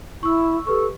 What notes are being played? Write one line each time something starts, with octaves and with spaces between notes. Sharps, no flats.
E4 C#6 E6
G4 A4 B4 C#6